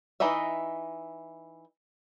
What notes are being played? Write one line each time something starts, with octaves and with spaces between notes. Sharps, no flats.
E3 D#4 D#5 E5